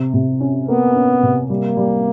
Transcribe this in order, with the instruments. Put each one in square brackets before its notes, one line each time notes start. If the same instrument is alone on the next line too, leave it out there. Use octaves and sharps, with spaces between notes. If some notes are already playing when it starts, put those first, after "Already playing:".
Already playing: [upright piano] C3
C3
C#4
[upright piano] A#3 [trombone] B3
[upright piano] C#4
C3
[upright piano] G3 [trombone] A#3
[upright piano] G3